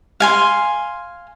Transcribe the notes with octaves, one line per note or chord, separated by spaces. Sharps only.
F5 G#5 C6